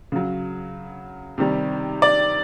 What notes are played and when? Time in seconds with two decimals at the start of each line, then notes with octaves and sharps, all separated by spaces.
0.12 C#3 F#3
1.38 C3 D#3 G3
2.02 D5